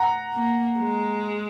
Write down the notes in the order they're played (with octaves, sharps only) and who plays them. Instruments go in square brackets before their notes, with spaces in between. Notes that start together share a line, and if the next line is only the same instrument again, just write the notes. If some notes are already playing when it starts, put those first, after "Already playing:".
Already playing: [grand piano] F#5 A#5
[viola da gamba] A#3
G#3